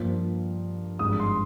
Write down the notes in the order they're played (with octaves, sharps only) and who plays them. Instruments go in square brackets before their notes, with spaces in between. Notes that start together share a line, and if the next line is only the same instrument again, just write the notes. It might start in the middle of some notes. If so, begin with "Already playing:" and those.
Already playing: [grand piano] G2 F3 A#3
G#1 G2 F3 G#3 D#6
C6